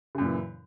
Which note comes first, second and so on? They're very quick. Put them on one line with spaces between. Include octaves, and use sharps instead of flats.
C#3 F#2 A#2 E3